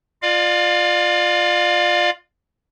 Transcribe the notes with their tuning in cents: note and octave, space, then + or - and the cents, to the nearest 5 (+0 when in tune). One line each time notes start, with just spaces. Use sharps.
F4 +0 D5 +35 F5 +20